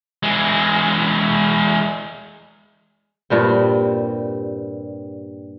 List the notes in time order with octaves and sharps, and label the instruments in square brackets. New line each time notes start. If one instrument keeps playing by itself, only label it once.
[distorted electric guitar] E3 G#3
[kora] G2 A#2 G3 C4